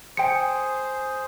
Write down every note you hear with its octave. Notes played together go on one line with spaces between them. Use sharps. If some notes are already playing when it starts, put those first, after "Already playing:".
G#4 C5 G5 C#7